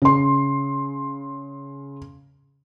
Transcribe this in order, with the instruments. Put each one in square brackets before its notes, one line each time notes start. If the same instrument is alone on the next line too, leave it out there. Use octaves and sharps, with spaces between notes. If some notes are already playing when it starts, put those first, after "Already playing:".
[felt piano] C#3 C6